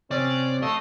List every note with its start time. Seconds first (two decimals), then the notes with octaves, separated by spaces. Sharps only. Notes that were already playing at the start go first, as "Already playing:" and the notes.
0.11 C3 C4 C#4 D5 F#6
0.62 A3 D#5 F5 C6 E6